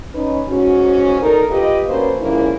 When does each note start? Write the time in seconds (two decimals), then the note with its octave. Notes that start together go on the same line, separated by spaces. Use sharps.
0.15 C#4 D#4 B4
0.49 G#2 C#4 F#4
1.21 D4 D#4 A4 A#4
1.51 F4 G4 B4 D#5
1.88 A#3 C#4 D4 F#4 B4 C5
2.21 D2 G#2 F3 A#3 C#4 E4